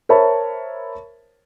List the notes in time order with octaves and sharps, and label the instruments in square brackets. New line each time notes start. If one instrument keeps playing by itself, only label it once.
[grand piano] A#4 C5 C#5 E5 A5 B5